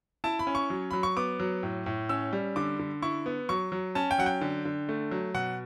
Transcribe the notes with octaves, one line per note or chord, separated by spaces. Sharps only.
E4 A5
B5
C#4
C#6
F#3
F#3 B5
C#6
B3 D6
F#3
A2
A2
C#4 E6
G3
D3 D6
D3
E4 C#6
B3
F#3 C#6
F#3
C#4 A5
G5
F#3 F#5
G5
D3
D3
A3
F#3
B2 F#5